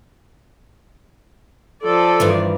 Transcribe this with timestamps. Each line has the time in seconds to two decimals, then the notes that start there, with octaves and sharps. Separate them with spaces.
1.84 F3 A4 D5
2.20 G2 D#3 E3